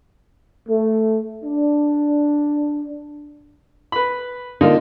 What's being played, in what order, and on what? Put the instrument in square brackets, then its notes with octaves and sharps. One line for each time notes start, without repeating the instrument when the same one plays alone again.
[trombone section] A3
D4
[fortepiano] B4 B5
[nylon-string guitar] D3 A#3 [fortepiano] D#4 F4